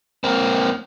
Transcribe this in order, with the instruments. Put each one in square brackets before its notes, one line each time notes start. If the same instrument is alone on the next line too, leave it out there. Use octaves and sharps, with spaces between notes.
[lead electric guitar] A#3 C4